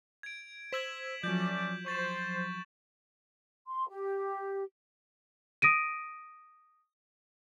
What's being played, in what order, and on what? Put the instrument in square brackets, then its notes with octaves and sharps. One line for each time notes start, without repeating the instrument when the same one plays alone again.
[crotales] G#6 D7
[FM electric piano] C5 E6 G#6 [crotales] B6 E7 F#7
[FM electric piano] F3 F#3 [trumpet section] A3 C#4 D5 [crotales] G6
[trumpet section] C5 [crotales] C#6 A6 E7
[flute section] C6
G4
[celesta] D#6 A#6 D7 D#7